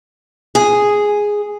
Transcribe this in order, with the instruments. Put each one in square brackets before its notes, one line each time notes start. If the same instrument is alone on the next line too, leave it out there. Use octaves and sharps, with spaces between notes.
[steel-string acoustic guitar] G#4